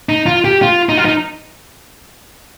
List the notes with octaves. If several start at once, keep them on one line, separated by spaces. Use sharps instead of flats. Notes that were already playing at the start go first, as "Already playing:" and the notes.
D#4
F4
G4
F4
D#4
F4
D#4